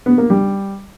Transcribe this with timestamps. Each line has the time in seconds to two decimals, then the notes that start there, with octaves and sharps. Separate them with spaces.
0.06 B3
0.18 A#3
0.30 G3